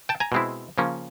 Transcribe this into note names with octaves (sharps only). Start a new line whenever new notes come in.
G5 A5
G#5 A#5
B2 G#3 C4 E4
C#3 F3 A#3 C#4